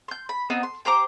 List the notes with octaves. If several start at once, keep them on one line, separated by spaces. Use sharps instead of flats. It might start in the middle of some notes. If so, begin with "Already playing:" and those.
C6 G6
B5
B3 C4 D#4 C5
C6
G4 C5 A#5 D6